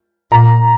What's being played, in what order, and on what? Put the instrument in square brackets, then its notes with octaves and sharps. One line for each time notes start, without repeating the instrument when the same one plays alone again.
[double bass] A#2 [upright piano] A#5